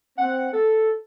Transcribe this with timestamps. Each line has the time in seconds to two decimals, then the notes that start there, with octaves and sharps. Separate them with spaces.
0.19 C4 F#5
0.54 A4